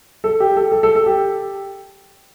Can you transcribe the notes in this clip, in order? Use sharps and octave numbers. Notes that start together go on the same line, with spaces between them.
A4
G4
A4
A4
A4
A4
G4